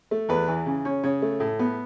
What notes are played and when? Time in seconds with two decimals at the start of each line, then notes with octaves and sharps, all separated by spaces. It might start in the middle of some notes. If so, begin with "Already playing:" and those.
0.11 A3
0.29 E2 B4
0.48 E3
0.66 C#3
0.85 C#4
1.04 C#3 C#5
1.22 A3
1.40 A2
1.59 B3